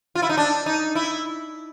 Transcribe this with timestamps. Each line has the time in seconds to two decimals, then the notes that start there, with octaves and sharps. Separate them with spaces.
0.15 F4
0.22 E4
0.29 D#4
0.37 D4
0.66 D#4
0.95 E4